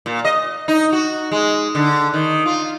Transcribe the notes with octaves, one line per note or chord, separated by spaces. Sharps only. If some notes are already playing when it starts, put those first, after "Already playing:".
A#2
D#5
D#4
F#4
G#3
D3
D#3
F4